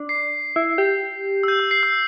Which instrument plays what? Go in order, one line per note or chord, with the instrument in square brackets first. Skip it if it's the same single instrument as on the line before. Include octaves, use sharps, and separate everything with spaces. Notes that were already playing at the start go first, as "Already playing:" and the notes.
Already playing: [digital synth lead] D4
[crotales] C7
[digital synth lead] E4
G4
[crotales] E6
G6
E6
C7
E6